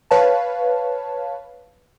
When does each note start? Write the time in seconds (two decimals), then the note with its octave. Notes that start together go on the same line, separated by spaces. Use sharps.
0.11 B4 C#5 F5 A5